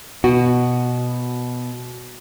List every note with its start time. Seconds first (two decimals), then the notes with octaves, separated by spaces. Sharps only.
0.24 B2 F#4